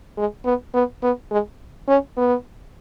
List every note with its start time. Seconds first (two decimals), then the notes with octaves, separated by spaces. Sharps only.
0.18 G#3
0.45 B3
0.74 B3
1.03 B3
1.31 G#3
1.88 C#4
2.17 B3